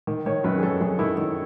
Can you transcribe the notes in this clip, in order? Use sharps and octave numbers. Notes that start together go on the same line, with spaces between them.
D#3
D#3 C#5
F#2 B4
G#4
F#2 A4
F#2 G#4
D#3 E4
D#3